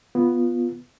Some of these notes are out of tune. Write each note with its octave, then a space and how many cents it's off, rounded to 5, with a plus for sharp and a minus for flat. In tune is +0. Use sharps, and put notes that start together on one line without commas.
B3 +0 F4 +0